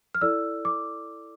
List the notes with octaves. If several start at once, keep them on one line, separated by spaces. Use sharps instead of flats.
F6
E4 A4 D5 E6
D6